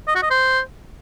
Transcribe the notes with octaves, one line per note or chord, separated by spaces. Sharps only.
D#5
F#4
D#5
C5